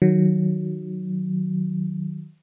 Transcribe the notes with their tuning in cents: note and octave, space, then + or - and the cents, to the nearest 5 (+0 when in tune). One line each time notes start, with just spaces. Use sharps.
D#3 +0 F#3 +0